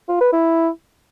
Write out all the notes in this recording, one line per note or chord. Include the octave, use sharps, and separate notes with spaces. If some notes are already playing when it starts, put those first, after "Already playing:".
F4
B4
E4